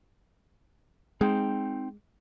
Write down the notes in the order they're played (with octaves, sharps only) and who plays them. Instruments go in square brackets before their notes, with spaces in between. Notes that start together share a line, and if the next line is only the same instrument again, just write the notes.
[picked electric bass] G#3 [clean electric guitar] C4 D#4 G5